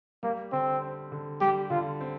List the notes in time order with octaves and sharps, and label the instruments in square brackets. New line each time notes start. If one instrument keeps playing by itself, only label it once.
[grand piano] G3 [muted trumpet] A#3
[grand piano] D3 [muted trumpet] C4
[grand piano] C4
D3
[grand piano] G3 [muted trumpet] G4
[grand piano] D3 [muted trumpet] F4
[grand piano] C4